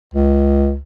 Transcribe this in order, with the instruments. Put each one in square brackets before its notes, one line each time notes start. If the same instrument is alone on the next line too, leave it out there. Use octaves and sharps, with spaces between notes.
[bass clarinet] C#2